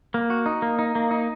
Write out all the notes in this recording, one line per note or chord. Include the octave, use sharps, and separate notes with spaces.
A#3
F#4
D#4
A#3
D#4
A#3
D#4